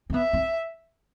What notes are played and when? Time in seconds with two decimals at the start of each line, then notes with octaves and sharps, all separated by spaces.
0.10 C4
0.14 B3 E5
0.33 C4